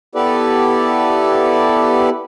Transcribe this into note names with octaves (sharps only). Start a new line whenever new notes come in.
B3 E4 G4 A4 B4 D5